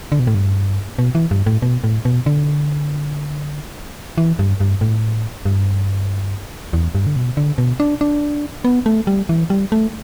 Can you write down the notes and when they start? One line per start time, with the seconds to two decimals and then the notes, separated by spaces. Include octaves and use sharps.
0.12 D3
0.19 B2
0.27 A2
0.35 G2
0.99 B2
1.15 E3
1.31 G2
1.46 A2
1.62 B2
1.84 A2
2.05 B2
2.26 D3
4.18 E3
4.39 G2
4.61 G2
4.81 A2
5.46 G2
6.73 E2
6.95 G2
7.06 D3
7.16 B2
7.37 D3
7.58 B2
7.80 D4
8.01 D4
8.65 B3
8.86 A3
9.07 G3
9.29 E3
9.50 G3
9.72 A3